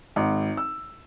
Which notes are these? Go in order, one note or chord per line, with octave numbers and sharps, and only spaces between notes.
G#1
E6